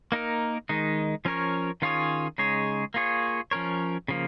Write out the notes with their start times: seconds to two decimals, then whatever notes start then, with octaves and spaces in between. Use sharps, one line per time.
0.12 A#3 D#4 A#4
0.69 D#3 G#3 D#4
1.25 F3 C#4 A#4 C#5
1.82 D#3 C#4 F4 G#4 C#5
2.38 C#3 G#3 D#4 G#4 C#5
2.94 A#3 F4 G#4 C#5
3.51 F3 C#4 A#4 C#5
4.08 C#3 F3 A#3